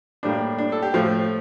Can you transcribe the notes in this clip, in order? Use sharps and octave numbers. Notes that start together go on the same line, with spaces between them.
A2 G3 A#3 D4
D4
A4
G4
A2 F3 A3 F4